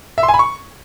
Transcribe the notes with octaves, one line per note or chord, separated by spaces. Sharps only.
E5
C6
G#5
B5
C#6